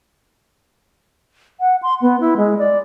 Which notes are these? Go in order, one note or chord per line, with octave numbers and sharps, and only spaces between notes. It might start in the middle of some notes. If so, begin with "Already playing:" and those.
F#5
C6
B3
E4
G#3
D5